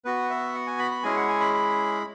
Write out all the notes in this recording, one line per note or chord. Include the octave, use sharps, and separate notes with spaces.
B3 F#4 B4
E5
F#5
G#5
B5
B5
G#3 C#4 E4 G#4 G#5
F#5
G#5
B5
B5